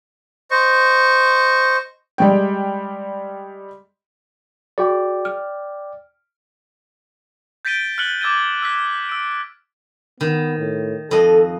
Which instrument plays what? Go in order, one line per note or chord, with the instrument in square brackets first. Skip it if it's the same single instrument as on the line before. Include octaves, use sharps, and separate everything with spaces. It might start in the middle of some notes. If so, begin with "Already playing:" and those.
[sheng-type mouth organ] C5 D#5 C#6
[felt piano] G3 G#3 G5
[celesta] F#4 G#4 [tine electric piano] D5 G5
[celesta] F6
[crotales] G6 A6 B6 D7 D#7 G7
F6 F#6 A6 C#7 F#7 G7
D6 E6 G#6 A6 D#7
E6 F#6 B6
E6 D7
[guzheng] D#3 [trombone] B3
[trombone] A2
[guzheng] F2 D#5 [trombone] A4